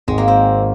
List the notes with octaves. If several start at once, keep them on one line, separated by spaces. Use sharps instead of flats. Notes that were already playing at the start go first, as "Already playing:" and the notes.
G#1 G#3
A#3
C4